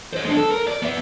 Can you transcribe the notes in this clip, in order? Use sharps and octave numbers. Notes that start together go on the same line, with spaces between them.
C5 D#5
G#3 D4
A4
A#4
D5
B3 E5